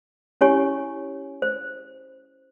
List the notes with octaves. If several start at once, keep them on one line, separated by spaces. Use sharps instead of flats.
C#4 E4 G4 C#5 G#5 C#6
C5